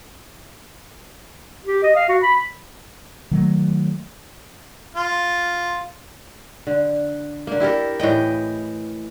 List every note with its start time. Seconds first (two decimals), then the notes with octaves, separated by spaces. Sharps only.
1.65 G4
1.83 D#5
1.96 F5
2.09 F#4
2.23 B5
3.31 D#3 F#3 A3
4.95 F4
6.67 D3
7.47 D3 A#3
7.60 E4 G4 A4 A#4
8.00 A2 E3 D#5 G5